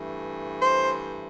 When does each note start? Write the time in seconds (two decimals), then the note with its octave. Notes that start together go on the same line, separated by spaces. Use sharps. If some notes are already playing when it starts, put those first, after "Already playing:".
Already playing: G2 E3 A3
0.61 C5